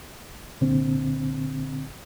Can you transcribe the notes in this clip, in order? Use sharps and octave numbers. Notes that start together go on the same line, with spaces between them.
C2 A#2 D3 C4